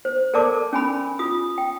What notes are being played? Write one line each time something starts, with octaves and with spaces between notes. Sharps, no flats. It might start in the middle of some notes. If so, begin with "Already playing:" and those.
C5
A4 A#4 D5 A5 D6
C#4 G#5 B5
F4 D#6
G5